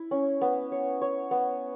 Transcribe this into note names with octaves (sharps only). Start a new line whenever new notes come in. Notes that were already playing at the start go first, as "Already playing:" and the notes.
Already playing: E4
C#4
B3
C#5
C#5
B3